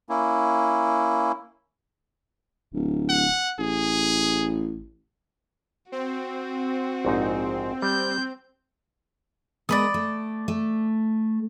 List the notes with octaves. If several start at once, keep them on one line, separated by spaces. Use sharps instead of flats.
A#3 C#4 E4
D1
F#5
A1 G#4
C4 F#4
A#1 G#2 D#4
G3 G6
G#3 B3 A#4 D5 B5 D#6
A3
A3